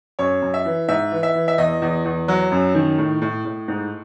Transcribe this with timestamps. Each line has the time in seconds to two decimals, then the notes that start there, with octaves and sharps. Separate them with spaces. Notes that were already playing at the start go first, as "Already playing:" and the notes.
0.19 F#2 C#5
0.42 F#2
0.54 E5
0.65 E3
0.88 G#2 E5
1.12 E3
1.23 E5
1.35 E3
1.48 E5
1.58 E2 D#5
1.82 E2
2.05 E2
2.28 F#3
2.52 F#2
2.75 D#3
2.98 A2
3.22 A2
3.45 A2
3.68 G#2